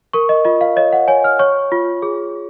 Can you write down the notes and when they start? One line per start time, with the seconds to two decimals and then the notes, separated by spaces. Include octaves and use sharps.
0.13 A#4 C#6
0.29 D#5
0.45 F4 D#5
0.61 F5
0.76 C#5 D#5
0.93 F#5
1.08 C#5 G#5
1.24 F6
1.39 C#5 C#6
1.72 F4
2.02 G#4